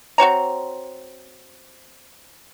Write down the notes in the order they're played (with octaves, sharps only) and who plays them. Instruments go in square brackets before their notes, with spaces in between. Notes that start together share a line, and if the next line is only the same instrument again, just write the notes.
[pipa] C4 F#4 C#5 A#5